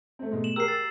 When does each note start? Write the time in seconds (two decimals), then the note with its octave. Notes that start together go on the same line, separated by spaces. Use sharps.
0.19 A3 C4
0.31 B2 G#3 A3
0.44 E7 F#7
0.56 G4 G#4 A#4 E6 C7
0.68 E6 A6